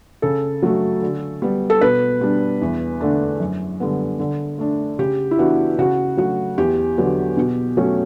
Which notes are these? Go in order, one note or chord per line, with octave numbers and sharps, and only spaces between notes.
C#3 A4
F#3 A3
D3
G3 B3
A4
B2 B4
G3 D4
E2
D3 A3 D4
F#2
D3 G3 B3
D3
A3 D4
C#3 G4
E4
E3 B3 D4 F#4
C#3 F#4
F#3 A3 F#4
E2 G4
D3 F#3 B3
B2
F#3 A3 C#4